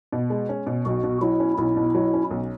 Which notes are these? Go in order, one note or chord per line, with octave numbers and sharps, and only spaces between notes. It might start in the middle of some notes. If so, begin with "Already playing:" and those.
B2
G#3
C#4
B2
B1 F#4
B2
F#3 E4
C#4
B1 E4
B2
F#3
C#4
B1